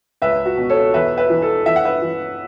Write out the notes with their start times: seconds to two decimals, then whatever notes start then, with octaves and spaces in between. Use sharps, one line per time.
0.22 C#2 B4 E5
0.46 F#4
0.57 B2
0.70 A4 C#5
0.93 E2 B4 E5
1.17 B4 E5
1.29 E3
1.42 A4
1.66 E3 E5
1.76 F#5
1.85 B4 E5
2.02 E3